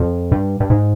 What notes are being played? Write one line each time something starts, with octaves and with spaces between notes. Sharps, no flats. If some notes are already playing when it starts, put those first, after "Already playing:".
Already playing: F2
G2
G2
G#2